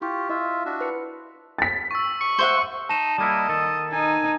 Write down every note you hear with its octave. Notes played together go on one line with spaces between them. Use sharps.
E4 F4 G4 C#6
E4 F4 D#5 E5
D4 F#4 E5
B4 C#7
A6 B6
C#6 E6
C#6 C#7
C5 E5 F#5
D#4 A5 E7
G3 A#3 E4 D#5
D#3 A4
D#4 G#5